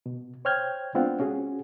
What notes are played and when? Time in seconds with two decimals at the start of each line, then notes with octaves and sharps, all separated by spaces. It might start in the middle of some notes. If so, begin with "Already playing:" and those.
0.06 B2
0.45 C5 C#5 G5 F6 G6 G#6
0.95 G#3 B3 C4 D4 F4 F#5
1.20 C#4 F#4 G#4